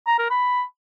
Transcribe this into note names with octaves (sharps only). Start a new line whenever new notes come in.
A#5
A#4
B5